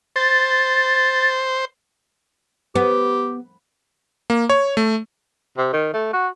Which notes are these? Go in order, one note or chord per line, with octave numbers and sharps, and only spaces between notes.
C5 A6
B3 G4
A#3
C#5
A3
C3
D#3
A3
F#4